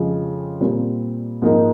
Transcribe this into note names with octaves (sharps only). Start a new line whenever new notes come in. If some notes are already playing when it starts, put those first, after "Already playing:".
Already playing: F2 C#3 F3 G#3
A#2 G3 C4
G#2 F3 A#3 D#4